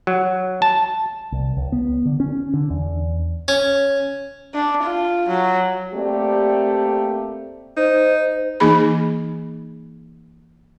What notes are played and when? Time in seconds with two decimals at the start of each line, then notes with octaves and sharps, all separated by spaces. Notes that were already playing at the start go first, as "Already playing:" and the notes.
0.07 F#3
0.62 A5
1.32 C2
1.57 C#2
1.72 B3
2.05 D3
2.20 C#4
2.54 D3
2.70 E2
3.48 C#4
4.54 D4
4.83 F4
5.28 F#3
5.93 A3 A#3 C4 G4 D5
7.77 D#4 C5
8.60 E3 A#3 D#4 G#4 B5